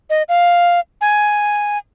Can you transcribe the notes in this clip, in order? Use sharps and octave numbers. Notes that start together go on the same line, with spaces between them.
D#5
F5
G#5